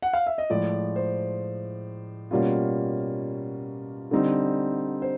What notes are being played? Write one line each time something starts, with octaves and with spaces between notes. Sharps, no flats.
F#5
F5
E5
D#5
A2 F3 G#3 D5
C5
B2 G3 A#3 C#4 F4
D3 G3 C4 D#4
C5